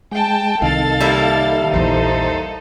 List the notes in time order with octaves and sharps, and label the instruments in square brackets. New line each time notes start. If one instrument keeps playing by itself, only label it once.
[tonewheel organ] G#3 [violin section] G5 A5
[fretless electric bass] C2 [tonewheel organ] D#3 [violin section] A4 F5 A6
[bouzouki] G3 A#3 E4
[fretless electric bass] A#1 E2 E3 [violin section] D#4 A4 [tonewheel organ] C5